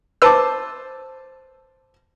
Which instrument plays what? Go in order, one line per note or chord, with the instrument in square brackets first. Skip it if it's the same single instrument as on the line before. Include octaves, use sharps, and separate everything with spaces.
[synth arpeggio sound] B4 E6 [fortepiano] C5 A5 D6